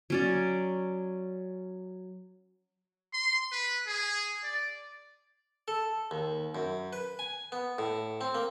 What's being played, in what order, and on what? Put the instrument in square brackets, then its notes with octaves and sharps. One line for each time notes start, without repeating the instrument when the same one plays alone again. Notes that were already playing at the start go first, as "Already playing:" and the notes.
[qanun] F#3 C#4 D5
[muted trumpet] C6
B4
G#4
D5
[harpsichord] A4
D#2
F#2
B4
G#5
B3
A2
C4
A#3